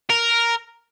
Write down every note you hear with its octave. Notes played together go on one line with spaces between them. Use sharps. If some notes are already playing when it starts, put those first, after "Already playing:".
A#4